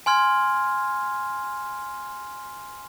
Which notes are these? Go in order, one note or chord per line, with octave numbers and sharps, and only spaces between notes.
G#5 C6 F6 G#6